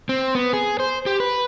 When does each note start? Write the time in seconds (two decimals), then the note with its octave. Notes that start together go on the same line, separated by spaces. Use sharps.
0.09 C4
0.35 B3
0.53 G#4
0.80 C5
1.06 G4
1.20 B4